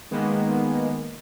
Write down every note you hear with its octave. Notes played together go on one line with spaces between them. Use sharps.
D#3 G#3 A#3 B3